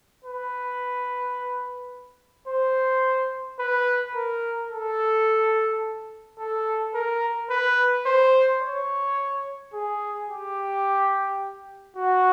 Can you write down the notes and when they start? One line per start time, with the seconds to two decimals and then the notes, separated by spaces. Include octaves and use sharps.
0.24 B4
2.47 C5
3.59 B4
4.15 A#4
4.71 A4
6.39 A4
6.94 A#4
7.50 B4
8.06 C5
8.62 C#5
9.73 G#4
10.29 G4
11.96 F#4